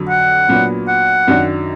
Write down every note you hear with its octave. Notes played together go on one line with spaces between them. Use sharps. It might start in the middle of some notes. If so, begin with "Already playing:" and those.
Already playing: F2 D3 F#3
F#5
A#2 F#3 B3 D4
F#5
F#2 D#3 F#3 D4 F#4